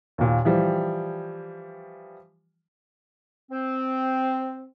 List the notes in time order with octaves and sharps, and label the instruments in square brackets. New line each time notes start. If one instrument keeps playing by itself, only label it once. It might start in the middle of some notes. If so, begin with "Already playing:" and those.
[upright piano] D#2 A#2
E3 F3 G3
[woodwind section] C4